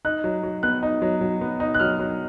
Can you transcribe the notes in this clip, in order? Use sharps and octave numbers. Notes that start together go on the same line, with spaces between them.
D#4 F#6
F#3
F#3
B3 F#6
D#4
F#3
F#3
B3
D#4
F#6
F#3 F6
F#3